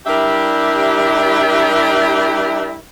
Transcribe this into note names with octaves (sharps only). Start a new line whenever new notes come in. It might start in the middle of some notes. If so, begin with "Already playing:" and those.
G3 D4 E4 G4 A#4 E5